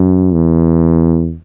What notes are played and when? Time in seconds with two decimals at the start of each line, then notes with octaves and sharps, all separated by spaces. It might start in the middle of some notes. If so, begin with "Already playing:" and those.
Already playing: F#2
0.33 E2